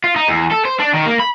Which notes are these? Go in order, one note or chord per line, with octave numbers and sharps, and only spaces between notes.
F4
D#4
E2
A4
C5
D4
D#3
A#3
B5